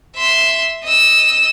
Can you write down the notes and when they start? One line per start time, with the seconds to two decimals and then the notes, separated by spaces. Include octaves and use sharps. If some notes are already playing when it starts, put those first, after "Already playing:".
0.16 E5 C6
0.84 D#5 E6